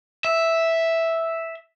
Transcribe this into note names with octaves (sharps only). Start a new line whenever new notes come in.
E5